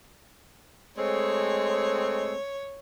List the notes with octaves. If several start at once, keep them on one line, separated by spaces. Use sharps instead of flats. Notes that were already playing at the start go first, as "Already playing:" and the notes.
G#3 A3 C4 C#5